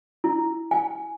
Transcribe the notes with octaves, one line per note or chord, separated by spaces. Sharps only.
E4
G#5